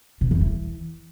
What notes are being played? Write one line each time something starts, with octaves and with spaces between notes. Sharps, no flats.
B2
E2
E3